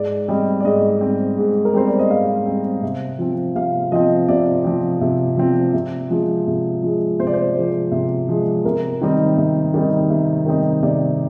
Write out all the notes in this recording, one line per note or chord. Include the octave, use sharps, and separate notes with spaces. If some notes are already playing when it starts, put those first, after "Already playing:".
Already playing: G#2 D5
G3 C4 D#5
D5
G#2 D#5
G3 C4
G#2
A#4
G3 C4 C5
D5
D#5
G#2 F5
G3 C4
C3
F3 C4
C3 F5
F3 C4 D#5
C3 D5
F3 C4
C3
F3 C4
C3
F3 G#3
C3
F3 G#3
C3 C5
D5
C5
F3 G#3
C3
F3 G#3
C3 A#4
D#3 G3 C4 D#4
C3
D#3 G3 C4 D#4
C3
D#3 G3 C4 D#4
C3 D5